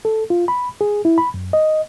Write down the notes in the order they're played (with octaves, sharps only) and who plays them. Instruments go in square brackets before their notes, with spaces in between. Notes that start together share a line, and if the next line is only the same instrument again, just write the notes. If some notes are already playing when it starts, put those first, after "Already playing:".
[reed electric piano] A4
F4
B5
G#4
E4
B5
F#2
D#5